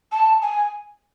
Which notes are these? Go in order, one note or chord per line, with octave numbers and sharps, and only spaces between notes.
A5
G#5